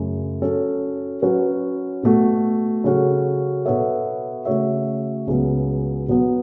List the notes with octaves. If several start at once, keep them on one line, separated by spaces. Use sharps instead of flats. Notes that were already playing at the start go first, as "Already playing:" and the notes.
Already playing: F#2 C#3 A3
F#3 C#4 A4
F#3 C#4 F#4 B4
B2 A3 F#4 A4
C#3 F#3 C#4 F#4 A4
B2 B3 A4 C#5 E5
C#3 A3 F#4 C#5 E5
C#2 C#3 F#3 B3
B2 F#3 B3